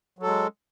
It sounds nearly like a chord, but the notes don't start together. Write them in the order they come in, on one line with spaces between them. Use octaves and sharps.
F#3 A4 G#3